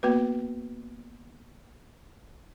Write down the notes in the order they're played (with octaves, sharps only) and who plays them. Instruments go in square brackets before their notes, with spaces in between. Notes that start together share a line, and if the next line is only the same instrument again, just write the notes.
[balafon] A#3 B3 F#4 B4